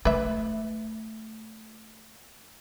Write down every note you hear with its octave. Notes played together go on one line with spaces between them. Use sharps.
A3 B4 E5